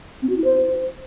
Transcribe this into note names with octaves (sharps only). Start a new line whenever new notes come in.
C4
F#4
E4
C5